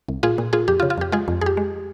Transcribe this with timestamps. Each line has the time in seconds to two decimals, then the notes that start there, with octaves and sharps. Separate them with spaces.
0.08 C2
0.23 A#2 F4 G#4
0.38 A#2
0.53 A#2 F4 G#4
0.68 F2 G4
0.80 F4
0.82 C#3
0.90 F4
0.98 F2 G4
1.12 G#3 F4 G#4
1.28 F2
1.41 F2 G4 G#4
1.57 G#3